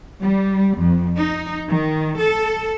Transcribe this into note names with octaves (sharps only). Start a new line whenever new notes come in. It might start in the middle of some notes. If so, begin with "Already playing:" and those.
G3
F2
D#4
D#3
A4